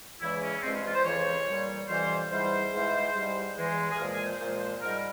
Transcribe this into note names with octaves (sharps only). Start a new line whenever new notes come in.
E2 C#3 E3 G#3 E4
C#4
G2 F3 G#3 C4
C#4
F4
C5
F2 C#3 E3 C#5
A#2 G3
F2 C3 E3 G3 C5
G#2 E3 G3 C5
G#2 E3 G#3
G#2 G3
E2 E3 G#3
G#4
A#2 F3 G#3 A#4
G#4
C5
A#2 F3 G#3 C5
C5
G#2 G3 A#4